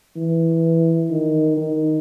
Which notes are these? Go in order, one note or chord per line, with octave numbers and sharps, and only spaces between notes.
E3
D#3
D#3